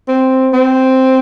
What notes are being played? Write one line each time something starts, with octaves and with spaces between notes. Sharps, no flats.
C4
C4